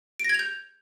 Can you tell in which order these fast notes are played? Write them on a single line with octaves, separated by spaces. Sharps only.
D7 A#6 G#6 F7 G6